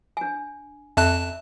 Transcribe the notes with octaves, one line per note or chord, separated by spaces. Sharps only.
D4 G#5
F2 E5 A5 F#6